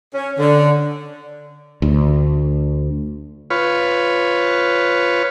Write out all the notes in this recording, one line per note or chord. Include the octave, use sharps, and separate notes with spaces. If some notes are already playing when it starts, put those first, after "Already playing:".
C#4
D3
D2
F4 B4 C#5